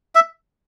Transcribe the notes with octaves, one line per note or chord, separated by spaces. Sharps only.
E5